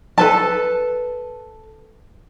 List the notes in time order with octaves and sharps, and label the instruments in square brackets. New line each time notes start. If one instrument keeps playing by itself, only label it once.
[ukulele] A4 B4 A5